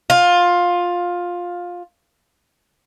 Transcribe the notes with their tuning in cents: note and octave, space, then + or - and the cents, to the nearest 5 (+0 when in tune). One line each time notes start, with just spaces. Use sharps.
F4 +15